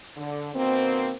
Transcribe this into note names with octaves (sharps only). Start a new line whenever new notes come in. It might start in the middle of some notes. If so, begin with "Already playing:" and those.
D3
B2 D#3 A#3 C4